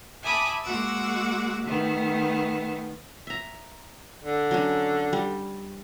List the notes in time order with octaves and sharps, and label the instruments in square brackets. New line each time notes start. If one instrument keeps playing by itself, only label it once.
[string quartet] E5 G#5 A5 B5 D6 D#6
G#3 A#3 F#4 F#5 D6 E6
D#3 A3 B3
[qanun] E5 A#5
[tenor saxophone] D3
[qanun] F#3 C#4 D4
G3